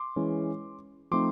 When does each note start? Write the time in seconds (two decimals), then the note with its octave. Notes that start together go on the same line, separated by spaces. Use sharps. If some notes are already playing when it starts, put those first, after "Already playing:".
Already playing: C6 D6
0.16 E3 G#3 C#4
1.11 F3 A3 C4 D#4 C6 D6